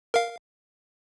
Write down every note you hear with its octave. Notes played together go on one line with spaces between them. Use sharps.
A#4 F5